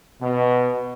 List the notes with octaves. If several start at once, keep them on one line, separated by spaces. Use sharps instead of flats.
B2